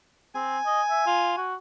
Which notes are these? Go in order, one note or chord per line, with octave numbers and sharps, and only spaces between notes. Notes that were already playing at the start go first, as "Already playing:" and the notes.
C4 G#5
D#5
E5
F4
F#4